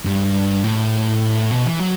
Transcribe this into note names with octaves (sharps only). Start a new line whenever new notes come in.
G2
A2
B2
E3
F#3